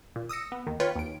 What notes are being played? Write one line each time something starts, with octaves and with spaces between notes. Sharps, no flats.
A#2
D#6 E6 A#6 C#7
B3
D#2 D#3
F4 B4 C#5 G5 F6
D#2 D7